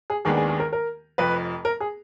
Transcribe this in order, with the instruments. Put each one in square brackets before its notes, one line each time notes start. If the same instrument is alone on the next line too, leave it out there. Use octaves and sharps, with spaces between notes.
[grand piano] G#4
[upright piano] D#2 D#3 G#3 B3 D4 [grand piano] G#4
[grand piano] G#4
G#4
A#4
A#4
[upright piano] F1 F2 F3 [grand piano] B4
[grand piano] A#4
G#4